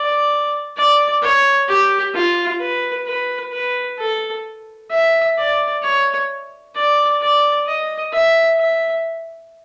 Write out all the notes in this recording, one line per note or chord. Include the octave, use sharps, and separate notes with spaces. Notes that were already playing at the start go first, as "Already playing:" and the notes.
Already playing: D5
D5
C#5
G4
F4
B4
B4
B4
A4
E5
D5
C#5
D5
D5
D#5
E5
E5